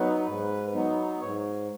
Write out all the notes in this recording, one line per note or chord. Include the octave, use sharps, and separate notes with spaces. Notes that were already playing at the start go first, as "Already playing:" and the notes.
Already playing: F#3 B3 D#4 B4
G#2
F#3 B3 D#4
G#2 C#5